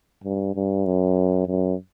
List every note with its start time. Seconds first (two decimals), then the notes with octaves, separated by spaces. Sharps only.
0.24 G2
0.55 G2
0.86 F#2
1.48 F#2